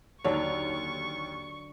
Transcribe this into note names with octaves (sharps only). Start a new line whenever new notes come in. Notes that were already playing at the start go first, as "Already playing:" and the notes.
D#2 D3 F#3 D4 C#5 C#6